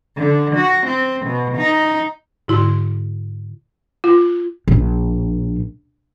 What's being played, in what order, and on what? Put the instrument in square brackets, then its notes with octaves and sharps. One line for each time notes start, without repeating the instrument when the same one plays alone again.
[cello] D3
F#4
C4
B2
D#4
[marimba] G#2 D3 E4 F#4 C6
[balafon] F4
[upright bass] A#1